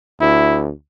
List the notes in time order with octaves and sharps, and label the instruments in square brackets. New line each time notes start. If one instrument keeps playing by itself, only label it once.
[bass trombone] D2 [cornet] E4